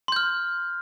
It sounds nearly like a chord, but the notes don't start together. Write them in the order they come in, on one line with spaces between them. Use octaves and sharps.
C6 G6 F6